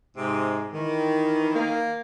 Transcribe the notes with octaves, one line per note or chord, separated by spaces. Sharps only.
G#2 C3 G#3
D#3 E3
A#3